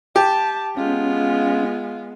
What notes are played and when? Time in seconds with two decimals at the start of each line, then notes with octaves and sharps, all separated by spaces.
0.16 G4 A5
0.77 G#3 B3 C#4 F4